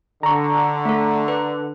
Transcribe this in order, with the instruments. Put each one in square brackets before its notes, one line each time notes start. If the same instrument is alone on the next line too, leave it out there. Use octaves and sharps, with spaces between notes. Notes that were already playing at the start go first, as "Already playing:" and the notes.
[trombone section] D3 [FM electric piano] A#5 C#6
[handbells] A3 A4
B4